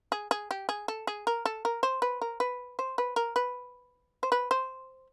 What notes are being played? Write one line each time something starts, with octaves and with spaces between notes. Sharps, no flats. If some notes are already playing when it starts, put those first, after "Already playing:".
G#4
G#4
G4
G#4
A4
G#4
A#4
A4
A#4
C5
B4
A#4
B4
C5
B4
A#4
B4
C5
B4
C5